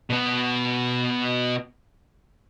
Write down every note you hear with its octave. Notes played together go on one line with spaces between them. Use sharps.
B2 B3